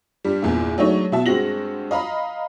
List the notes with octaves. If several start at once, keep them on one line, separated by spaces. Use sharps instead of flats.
G2 G3
G1 E2 A#2 E4
F#3 G#3 A3 D4 D#4 C#5
B2 E4 F#4 E5 A5
G2 G#3 C4 F#4 A#6 F#7
D#5 F5 A#5 B5